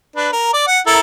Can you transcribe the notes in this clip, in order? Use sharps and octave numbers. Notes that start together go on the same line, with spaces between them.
D4 B4
A#4
D5
F#5
E4 A4 A#4